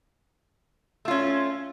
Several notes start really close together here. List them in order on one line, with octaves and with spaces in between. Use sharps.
A3 F4 C#4